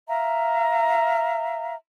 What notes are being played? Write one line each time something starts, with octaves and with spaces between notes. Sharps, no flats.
E5 F5 A#5